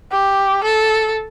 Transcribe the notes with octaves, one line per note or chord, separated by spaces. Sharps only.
G4
A4